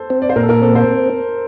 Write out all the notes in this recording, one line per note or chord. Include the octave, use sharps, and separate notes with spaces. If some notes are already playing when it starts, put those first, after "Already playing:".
Already playing: A4 C5
C4
D5
C5
A#2 A#4
A4
A#4
C4 A4
C5